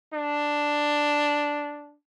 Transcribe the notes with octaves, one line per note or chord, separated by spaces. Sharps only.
D4